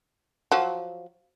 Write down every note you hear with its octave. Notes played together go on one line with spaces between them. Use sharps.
F3 F#3